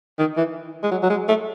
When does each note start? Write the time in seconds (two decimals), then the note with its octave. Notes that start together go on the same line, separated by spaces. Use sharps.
0.19 D#3
0.37 E3
0.83 G#3
0.91 F#3
1.03 F#3
1.10 G#3
1.28 A3